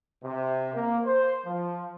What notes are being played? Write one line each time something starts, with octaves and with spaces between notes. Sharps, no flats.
C3
A#3
C5
F3